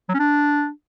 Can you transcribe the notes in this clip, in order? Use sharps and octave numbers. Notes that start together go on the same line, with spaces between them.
F#3
C#4
D4